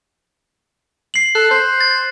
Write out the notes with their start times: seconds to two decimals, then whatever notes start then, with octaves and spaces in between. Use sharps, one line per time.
1.14 C7 F#7
1.35 A4 F#6
1.51 C5
1.81 A6